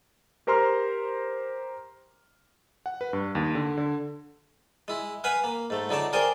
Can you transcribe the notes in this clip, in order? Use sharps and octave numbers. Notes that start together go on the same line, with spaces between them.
G4 A#4 C5 A#5 C6 F6
F#5
B4
G2
D#2
D3
D3
G#3 E4
B4 F5 F#5 G#5 B5
A#3
G#2 A3
C#2 D3 D#4 D5 A5
G#4 A#4 C5 D5 G5 G#5